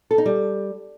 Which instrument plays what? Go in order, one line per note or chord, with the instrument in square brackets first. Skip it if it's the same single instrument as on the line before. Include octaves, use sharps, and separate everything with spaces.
[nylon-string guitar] A4
D#4
G3